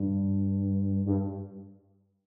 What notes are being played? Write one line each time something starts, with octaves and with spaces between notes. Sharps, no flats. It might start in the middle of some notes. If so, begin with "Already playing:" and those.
Already playing: G2
G2